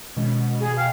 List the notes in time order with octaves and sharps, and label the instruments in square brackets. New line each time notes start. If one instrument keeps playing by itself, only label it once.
[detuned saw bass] B2 [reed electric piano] D#3 G#3 C#4
[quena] G#4
[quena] F5 [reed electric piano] G5 G#5